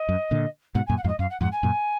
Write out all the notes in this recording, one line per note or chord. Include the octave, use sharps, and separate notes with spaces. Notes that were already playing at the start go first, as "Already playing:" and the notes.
Already playing: D#5
F#2
A#2 D3
G#2 B2 F#5
G#5
F#2 A#2
F#5
F2 G#2 F5
D#5
F#2 F5
F#5
F2 G#2 F#5
G#5
F#2 A#2